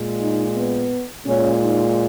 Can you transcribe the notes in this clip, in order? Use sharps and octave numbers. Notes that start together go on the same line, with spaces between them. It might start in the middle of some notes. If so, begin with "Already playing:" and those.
Already playing: A#2 G#3
D#4
B3
A#2 G#3 C#4
D#4